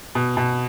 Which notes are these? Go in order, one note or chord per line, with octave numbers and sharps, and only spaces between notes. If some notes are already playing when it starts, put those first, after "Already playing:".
B2
B2